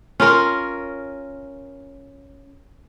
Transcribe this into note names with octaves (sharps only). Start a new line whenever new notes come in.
C#4 F4 A#4